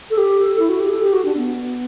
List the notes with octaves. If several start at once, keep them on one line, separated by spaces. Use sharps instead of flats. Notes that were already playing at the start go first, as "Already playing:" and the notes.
A4
G4
A4
E4
F#4
G4
A4
G4
F#4
D4
B3